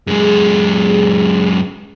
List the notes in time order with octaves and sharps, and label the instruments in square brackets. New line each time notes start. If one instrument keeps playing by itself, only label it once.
[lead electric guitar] F#2 G#3 [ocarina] G#4